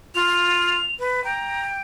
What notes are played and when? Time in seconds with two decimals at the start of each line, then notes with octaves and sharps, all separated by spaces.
0.15 F4 F7
0.99 B4
1.24 G5 A#5